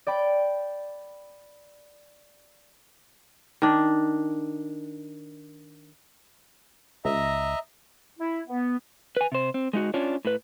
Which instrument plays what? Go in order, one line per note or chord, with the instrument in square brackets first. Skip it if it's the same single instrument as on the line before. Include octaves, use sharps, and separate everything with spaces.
[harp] D5 G5 B5 D7
[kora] D#3 D4
[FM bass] C#2 [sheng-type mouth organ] D#5 E5 A#5
[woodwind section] E4
B3
[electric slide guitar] B4 G#5
C3 C5
C4
G#3 D#4 F#4
C#4 D4 F4 C#5
A2 B4